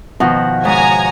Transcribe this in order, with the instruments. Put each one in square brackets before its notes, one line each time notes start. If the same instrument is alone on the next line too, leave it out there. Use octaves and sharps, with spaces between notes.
[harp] B2 D#3 F3 [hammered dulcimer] F#5
[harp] G#2 [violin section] C#5 G#5 A#5